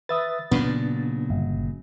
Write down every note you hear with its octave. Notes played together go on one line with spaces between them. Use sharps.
B4 E5 D#6 A6
A#2 C#3 F#3 B3 D4
G1